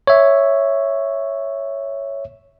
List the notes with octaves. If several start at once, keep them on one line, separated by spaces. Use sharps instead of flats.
C#5 E5